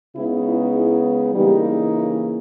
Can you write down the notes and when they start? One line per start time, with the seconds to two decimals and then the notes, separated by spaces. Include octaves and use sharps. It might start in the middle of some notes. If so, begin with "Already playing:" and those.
0.15 C#3 G#3 B3 D#4 E4
0.45 E4
0.75 E4
1.34 C#3 E3 G3 A#3 D#4 G4
1.94 E4